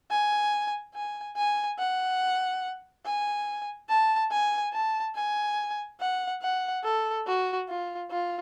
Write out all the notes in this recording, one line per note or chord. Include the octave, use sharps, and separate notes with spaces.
G#5
G#5
G#5
F#5
G#5
A5
G#5
A5
G#5
F#5
F#5
A4
F#4
F4
F4